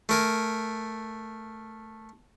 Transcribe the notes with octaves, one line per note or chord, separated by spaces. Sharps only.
A3 A#4 G#5